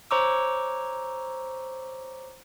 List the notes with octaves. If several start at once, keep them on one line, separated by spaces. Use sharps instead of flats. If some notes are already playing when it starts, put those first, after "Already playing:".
C5 C#5 A#5 C#6 D6 E6